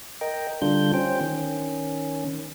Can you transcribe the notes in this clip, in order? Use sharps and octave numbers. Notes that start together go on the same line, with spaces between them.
A#4 D#5 G5
D3 G3 D4 F4 G6
C#4 C5 G5
D#3 C#4